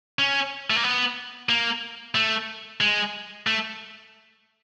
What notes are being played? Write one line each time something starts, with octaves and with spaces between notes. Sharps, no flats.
C#4
A3
A#3
B3
A#3
A3
G#3
A3